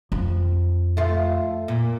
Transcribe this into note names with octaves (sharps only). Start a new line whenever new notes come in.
F2
A3 F4
A#2